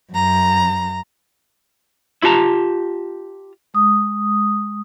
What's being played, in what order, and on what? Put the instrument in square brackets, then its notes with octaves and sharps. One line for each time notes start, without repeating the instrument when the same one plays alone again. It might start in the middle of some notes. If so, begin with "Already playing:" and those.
[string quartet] F#2 A#5
[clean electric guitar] E4 F4 G4 A5 A#5
[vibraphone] G#3 D#6